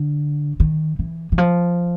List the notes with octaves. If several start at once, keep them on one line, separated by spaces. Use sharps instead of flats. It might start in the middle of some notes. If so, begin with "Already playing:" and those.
Already playing: D3
D#3
E3
E3
F3